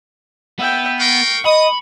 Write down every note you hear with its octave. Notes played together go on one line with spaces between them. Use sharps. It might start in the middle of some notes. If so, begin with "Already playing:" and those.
B3 E5 G5
A#4 F5 G5 C#6
D#5 B5 D#6